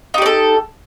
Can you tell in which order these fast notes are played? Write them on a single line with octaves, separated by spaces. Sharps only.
D#4 G4 D5 A4